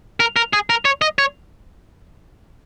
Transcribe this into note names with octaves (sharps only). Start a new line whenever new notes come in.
A#4
A#4
G#4
A#4
C#5
D#5
C#5